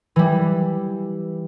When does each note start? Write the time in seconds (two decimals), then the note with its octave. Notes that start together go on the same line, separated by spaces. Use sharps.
0.16 E3 G3